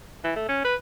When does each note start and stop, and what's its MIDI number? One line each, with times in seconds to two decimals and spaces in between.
0.24 0.32 52
0.36 0.44 57
0.48 0.61 61
0.65 0.75 71